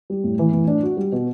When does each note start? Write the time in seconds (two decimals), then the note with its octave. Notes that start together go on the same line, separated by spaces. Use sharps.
0.10 G3
0.24 A2
0.39 E3
0.53 A2
0.68 D4
0.83 F#4
0.97 G3
1.12 B2